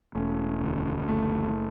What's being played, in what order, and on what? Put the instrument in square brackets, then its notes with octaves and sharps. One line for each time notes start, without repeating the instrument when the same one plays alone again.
[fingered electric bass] E1 [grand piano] A3 C#4
[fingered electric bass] D2
[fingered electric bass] F#1 [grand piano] A3